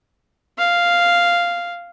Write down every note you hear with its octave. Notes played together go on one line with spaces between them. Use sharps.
F5